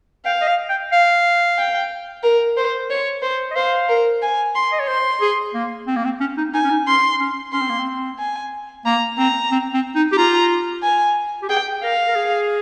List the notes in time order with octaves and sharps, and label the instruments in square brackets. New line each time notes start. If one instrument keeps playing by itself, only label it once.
[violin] F5 [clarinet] G5
[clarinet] D#5
F5
G5
F5
[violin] G5
A#4
C5
C#5
C5
[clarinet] D#5
[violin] C5 [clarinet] F5
[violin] A#4
G#5
C6
[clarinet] D#5
C#5
[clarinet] C5 [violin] C6
[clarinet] G#4
A#3
C4
A#3
C4
C#4
D#4
[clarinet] D#4 [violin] G#5
[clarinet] C#4
D#4
[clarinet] C#4 [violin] C6
[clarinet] C#4
[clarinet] C#4 [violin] C6
[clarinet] C4
A#3
C4
[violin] G#5
[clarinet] A#3 [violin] A#5
[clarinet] C4 [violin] A#5
[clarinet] C4
C4
D#4
G4
[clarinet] F4 [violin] A#5
[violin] G#5
[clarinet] G4
[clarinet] G#4 [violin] G5
[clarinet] A#4 [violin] F5
[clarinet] A#4
G#4